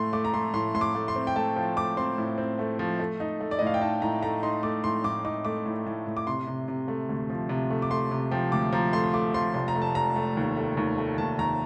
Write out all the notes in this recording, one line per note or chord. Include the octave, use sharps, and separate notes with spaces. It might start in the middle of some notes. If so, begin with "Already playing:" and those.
Already playing: A2 A3 C6
A3 D6
A#5
A3 C6
A2 C6
A2 C6
D6
A3
C6
C4
G5
A3 A5
F3 G5
A3 D6
C4 C6
A2
C4
A3
F3
A3
D#4
A3
D5
A2 D#5
F5
G5
D#4 A5
A2 A#5
A3 A#5
D#4 C6
A3 D6
A2 C6
A2 D6
D#4 D6
A3 D6
A2
A2
A2
D6
C3 C6
C3
C3
A3
D2
F3
C3
A3
D6
A3 C6
C3
F3 G5
D2 D6
F3 A#5
A3 C6
C6
A3 D6
F3 C6
F1 C6
A#5
A3
A5
F1 A#5
A3
D#2
A3
D#2
A3
D#2 A5
D#2 A#5